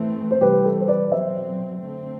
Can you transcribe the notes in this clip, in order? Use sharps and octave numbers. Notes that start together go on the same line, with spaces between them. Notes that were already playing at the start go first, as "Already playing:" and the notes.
Already playing: A2 E3 A3 C4
C5
C3 E3 G3 G4 B4
A4
C5
B4 D5
B2 F#3 C4 C5 E5
D3 A3 C4